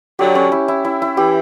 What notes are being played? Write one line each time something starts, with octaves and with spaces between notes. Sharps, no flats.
D3 F#3 G4
C#4
E4
E4
E4
E4
E3 G4